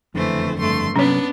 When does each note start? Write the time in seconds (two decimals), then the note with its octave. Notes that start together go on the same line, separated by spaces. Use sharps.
0.14 F#1 F2 D3 E3 A3 C5
0.59 G2 A3 C6
0.96 C3 F#3 A#3 B3 C#4 D4 C#5